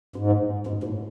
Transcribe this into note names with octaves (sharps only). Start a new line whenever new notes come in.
G#2
G#2
A2